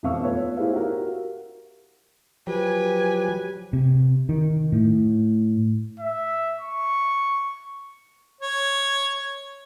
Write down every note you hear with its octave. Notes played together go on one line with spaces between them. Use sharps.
E1 F2 F5 C#6 E6
A3 B3 F4 B4 C#5
E4 G4 G#4 C5 F5
F#4 G4 A#4 F5
F3 F#3 G4 B4 G#5
C3
D#3
A2
E5
C#6
C#5